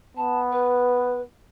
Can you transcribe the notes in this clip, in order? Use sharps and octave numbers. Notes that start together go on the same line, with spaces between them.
B3 A5
B4